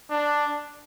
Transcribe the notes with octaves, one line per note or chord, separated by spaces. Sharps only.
D4